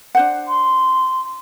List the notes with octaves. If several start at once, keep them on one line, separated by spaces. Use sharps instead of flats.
D4 C5 F#5
C6